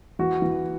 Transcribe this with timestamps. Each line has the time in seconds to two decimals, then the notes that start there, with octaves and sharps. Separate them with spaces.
0.19 E3 F#4
0.42 E3